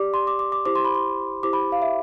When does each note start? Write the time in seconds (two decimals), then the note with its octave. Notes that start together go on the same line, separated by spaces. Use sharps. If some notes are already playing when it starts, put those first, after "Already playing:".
Already playing: G4 D5 D6
0.14 C6
0.27 D6
0.39 D6
0.52 D6
0.65 E4 G4 C5 D6
0.75 C6
0.85 B5
0.95 C6
1.43 E4 G4 C5 D6
1.53 B5
1.72 F5
1.82 E5